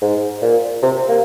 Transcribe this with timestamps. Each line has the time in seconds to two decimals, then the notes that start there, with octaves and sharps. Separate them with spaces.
0.02 G#2
0.42 A#2
0.83 C3
1.09 A#3